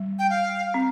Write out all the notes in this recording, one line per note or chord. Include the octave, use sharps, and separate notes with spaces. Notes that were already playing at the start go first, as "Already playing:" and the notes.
Already playing: G3
G5
F5
C4